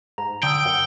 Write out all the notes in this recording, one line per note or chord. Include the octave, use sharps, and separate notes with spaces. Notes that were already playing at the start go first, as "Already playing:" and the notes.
G#2 A#5
D3 G5 D#6 E6
F#2 F#5